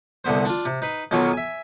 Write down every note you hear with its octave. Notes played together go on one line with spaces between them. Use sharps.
C2 D3 B3 C5
D4 F4
C3
D#4 B4
B1 B2 D#3 F#3 F4 C#6
E5 G#5